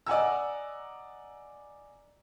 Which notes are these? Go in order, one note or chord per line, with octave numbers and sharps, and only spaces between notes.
D5 D#5 F#5 G#5 A#5 E6